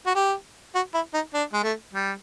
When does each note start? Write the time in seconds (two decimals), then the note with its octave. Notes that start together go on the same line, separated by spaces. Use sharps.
0.06 F#4
0.15 G4
0.75 F#4
0.94 E4
1.14 D#4
1.34 D4
1.53 G#3
1.63 A3
1.93 G3